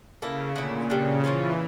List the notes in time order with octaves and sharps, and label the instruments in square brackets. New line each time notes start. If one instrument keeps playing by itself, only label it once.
[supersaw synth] C#3 [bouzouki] A#3 E4 A4
[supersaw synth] A#2 [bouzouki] D3 A3 E4
[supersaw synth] C#3 [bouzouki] G3 D4 A4
[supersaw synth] E3 [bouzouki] F3 C#4 F4 C#5